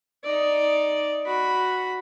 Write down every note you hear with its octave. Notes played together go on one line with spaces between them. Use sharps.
D#4 D5
F#4 B5